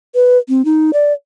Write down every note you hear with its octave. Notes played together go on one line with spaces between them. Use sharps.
B4
C4
D#4
D5